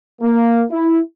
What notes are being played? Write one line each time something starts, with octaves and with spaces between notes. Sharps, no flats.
A#3
E4